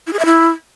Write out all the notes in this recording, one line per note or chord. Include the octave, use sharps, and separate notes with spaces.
E4
G#4
E5
E4